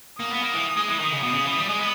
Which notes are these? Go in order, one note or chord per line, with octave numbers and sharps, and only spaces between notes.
A#3 D#6
B3
A#3
E3
G#3
E3
D#3
C#3
B2 D#6
C#3
E3
G3
G#3
B3